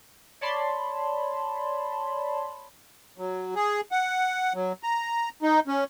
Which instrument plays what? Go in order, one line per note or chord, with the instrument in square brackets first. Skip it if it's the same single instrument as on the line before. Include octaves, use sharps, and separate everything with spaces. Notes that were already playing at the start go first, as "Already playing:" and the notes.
[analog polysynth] C#5 D5 A5 B5 C6
[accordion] F#3
G#4
F#5
F#3
A#5
D#4
C#4